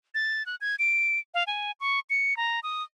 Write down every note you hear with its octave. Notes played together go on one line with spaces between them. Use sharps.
A6
F#6
G#6
D7
F5
G#5
C#6
C#7
A#5
D#6